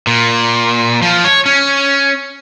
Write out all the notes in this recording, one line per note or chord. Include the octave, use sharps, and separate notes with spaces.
A#2
F3
C#5
C#4